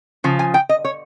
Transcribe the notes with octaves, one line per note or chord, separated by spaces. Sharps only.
C#3 F3
G#5
G5
D#5
C#5